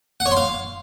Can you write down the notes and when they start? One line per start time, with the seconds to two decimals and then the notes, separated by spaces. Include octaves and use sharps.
0.20 F#5
0.26 C#5
0.31 C6
0.37 F5